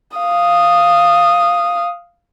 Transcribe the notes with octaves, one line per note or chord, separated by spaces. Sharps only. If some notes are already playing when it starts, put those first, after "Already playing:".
F5 D#6